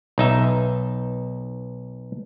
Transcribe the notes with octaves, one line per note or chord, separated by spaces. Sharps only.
B1 D#4 E5